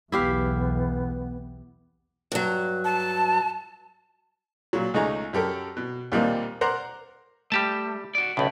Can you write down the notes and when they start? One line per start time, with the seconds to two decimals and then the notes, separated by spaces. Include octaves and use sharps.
0.12 B1 E2 B3 E4 G4 F5
2.32 G2 F#3
2.85 A5
4.73 A#2 F#3
4.94 C#2 A3 D#4 G#4 A#5
5.33 F#2 G4 A4 A#4
5.77 B2
6.12 D#2 A#2 G3 A#3 C4 D#4
6.61 A#4 C5 D5 F#5 A#5
7.52 G3 A3 G4 A5
8.15 F#4 D5
8.37 B1 A2 C#3 B5